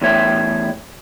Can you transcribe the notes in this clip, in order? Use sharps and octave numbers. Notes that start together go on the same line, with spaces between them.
E2 A2 C#5 E5